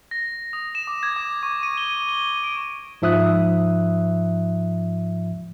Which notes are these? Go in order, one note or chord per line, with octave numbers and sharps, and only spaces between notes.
A#6
D#6
E7
D6
G#6
D6
C#6
D#7
G7
G7
D7
G#2 F3 E5 D#6 F#6